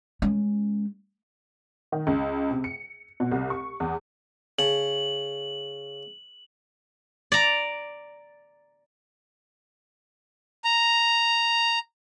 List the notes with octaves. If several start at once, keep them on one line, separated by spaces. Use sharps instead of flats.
G#3 C#4
D#3
C#2
C3
C#7
B2
C2
C#6
E2
C#3 A5 F#7
D5 A#5
A#5